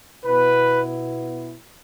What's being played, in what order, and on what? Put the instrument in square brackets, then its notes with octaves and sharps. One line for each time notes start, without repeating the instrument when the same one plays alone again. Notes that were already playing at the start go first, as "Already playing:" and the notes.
[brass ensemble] B2 B3 E4 B4